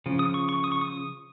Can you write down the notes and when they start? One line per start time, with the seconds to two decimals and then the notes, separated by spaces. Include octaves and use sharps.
0.06 C#3 F3
0.19 D#6
0.34 C#6
0.49 C#6
0.64 D#6
0.72 C#6
0.81 D#6